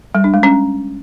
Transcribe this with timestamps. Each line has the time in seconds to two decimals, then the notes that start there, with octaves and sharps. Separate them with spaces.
0.15 G3
0.24 D4
0.34 G#3
0.43 C#4